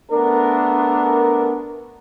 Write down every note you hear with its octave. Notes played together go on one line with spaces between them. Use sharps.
A3 B3 D4 A#4